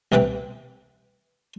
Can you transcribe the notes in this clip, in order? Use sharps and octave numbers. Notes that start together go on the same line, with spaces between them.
C2 C3 E3 B4 G5